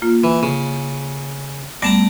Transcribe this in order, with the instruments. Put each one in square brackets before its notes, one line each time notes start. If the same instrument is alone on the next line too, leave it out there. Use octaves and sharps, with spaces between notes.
[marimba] A#3 F4
[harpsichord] E3
C#3
[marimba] G3 A3 B3 [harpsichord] D5 A5 A#5